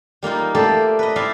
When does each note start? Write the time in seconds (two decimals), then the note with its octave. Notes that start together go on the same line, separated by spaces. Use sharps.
0.23 G3 A#3 D#4 F4
0.55 A3 A#3 G4 A4 C5 D5
0.99 B4 D#5
1.16 E4 C5 D5 F5 G5